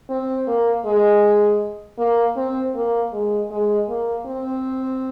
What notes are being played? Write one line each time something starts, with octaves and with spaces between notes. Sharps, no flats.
C4
A#3
G#3
A#3
C4
A#3
G#3
G#3
A#3
C4